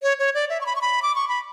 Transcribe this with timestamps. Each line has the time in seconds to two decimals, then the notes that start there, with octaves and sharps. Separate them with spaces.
0.03 C#5
0.19 C#5
0.34 D5
0.50 E5
0.61 C#6
0.66 B5
0.76 C#6
0.81 B5
1.02 D6
1.15 C#6
1.28 B5